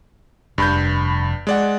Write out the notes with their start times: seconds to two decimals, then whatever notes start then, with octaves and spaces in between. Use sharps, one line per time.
0.58 F1 G2 B5 G6
1.47 G#3 D5 F#5